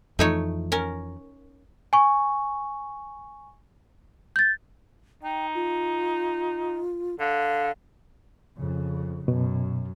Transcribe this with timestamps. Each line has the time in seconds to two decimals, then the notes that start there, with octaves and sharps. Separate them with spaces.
0.19 F2 E3 F3 A3 D#4 C#5
0.72 C#4 A#4
1.93 G#5 C#6
4.36 G6 A6
5.23 D#4 G5
5.55 F4
7.19 D3 F5
8.57 F2 C#3
9.28 F#2 B2